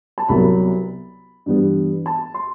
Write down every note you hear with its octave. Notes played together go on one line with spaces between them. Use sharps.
A5
C2 C3 F#3 B3 B5
G2 E3 G3 B3
A5
C6